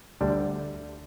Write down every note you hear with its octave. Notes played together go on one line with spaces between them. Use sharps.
D2 D3 G3 D4